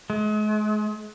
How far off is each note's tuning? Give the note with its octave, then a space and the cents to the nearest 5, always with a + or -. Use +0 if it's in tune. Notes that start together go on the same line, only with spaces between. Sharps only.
G#3 +40